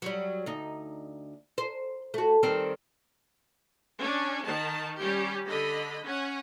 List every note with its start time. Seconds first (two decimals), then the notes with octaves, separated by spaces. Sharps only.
0.02 F#3 G3
0.46 D2 D#4
1.58 C5
2.14 A3 F#4
2.43 D#3 G3 C4
4.00 C#4 D4
4.46 D#3 A5
4.97 G3 C#4 G4
5.46 D3 D#5 B5
6.04 C#4 F#5